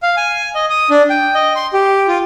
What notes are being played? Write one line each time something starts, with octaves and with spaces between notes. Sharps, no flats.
F5
G#5
D#5
D#6
D4
G5
D#5
C6
G4
F4